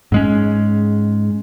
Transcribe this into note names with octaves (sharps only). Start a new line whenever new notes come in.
G#2 G#3 C#4